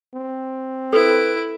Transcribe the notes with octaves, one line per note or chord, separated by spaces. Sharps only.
C4
E4 A4 B4 D7